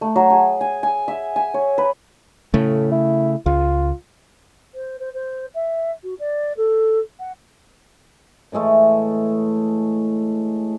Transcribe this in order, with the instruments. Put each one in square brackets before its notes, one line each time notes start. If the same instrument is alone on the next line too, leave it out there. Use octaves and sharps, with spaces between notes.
[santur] A3
F#3
G#4
G#5
G#5
E5
G#5
C#5
B4
[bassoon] A2 [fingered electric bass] C#3 A3
[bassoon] E4
[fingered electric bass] C#2 [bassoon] F4
[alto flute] C5
C5
C5
E5
F#4
D5
A4
F#5
[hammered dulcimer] A2 E3 G#3 A3